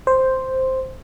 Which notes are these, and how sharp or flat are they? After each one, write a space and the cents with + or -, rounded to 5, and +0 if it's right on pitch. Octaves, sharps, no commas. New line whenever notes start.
C5 +0